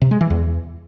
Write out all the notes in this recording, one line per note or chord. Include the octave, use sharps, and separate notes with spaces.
C3
G#3
E3
E2